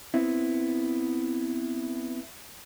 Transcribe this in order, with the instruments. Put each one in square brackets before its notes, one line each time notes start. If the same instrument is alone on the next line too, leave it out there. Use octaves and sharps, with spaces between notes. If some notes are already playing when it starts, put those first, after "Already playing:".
[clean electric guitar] B3 C4 E4